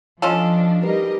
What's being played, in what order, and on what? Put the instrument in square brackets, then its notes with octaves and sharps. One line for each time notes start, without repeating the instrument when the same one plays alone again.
[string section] F3 D4 [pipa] C#4 F4 A4 [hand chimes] D#5 F5
[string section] G3 A#4 D#5 [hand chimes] D#4 B4 [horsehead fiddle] G4